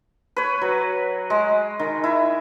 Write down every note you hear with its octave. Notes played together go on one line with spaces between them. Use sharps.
B4 C#5
F#3
G#3
D#3
E4